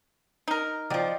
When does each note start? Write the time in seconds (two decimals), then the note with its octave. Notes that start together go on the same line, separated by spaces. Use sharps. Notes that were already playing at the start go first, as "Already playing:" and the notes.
0.48 D#4 A#4
0.90 F3 F#3 D5 D#5 G5